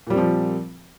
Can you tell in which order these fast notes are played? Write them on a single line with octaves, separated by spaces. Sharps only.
A#2 G3 C4 F3